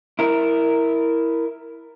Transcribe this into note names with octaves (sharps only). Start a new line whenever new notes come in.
E4 A#4